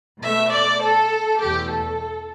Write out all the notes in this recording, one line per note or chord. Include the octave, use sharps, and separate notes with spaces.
B2 A3 E5
D5
A4
E2 B2 A3 G4
A4